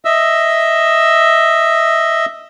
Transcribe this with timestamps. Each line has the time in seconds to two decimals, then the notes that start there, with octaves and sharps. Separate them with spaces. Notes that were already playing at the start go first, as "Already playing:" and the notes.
0.05 D#5 E5 E6